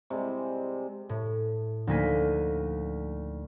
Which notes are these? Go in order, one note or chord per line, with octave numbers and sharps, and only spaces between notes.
C3 G3 G#3
A2
D2 F3 A#3 D#4 G#5 B6